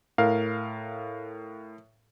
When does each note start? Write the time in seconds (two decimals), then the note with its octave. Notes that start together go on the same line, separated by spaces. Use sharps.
0.18 A2 A#4 F5